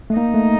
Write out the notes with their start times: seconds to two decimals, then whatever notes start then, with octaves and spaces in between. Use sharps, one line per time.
0.10 A3
0.16 A#3 D#4
0.34 A3